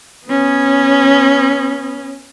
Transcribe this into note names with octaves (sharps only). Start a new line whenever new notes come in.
B3 C#4